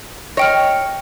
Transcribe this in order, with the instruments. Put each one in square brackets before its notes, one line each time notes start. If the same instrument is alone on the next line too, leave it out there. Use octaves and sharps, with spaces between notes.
[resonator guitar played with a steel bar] C#5 [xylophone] D#5 G5 F6